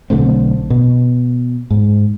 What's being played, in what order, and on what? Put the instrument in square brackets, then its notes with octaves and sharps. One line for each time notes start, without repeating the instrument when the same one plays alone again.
[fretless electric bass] B1 D3 A3 C4
B2
G#2